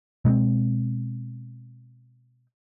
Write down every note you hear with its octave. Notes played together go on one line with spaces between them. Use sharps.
B2 G#3 A#3 C4